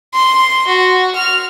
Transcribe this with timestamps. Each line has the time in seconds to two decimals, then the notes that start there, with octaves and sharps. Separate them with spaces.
0.14 C6
0.67 F#4
1.15 F6